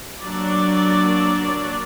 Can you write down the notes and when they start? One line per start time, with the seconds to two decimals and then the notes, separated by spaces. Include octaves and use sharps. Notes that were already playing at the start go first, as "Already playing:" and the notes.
0.22 F#3 A#3 D4 D5